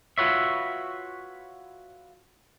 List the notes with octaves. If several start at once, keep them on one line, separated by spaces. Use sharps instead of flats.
F4 F#4 B4 C#5 E5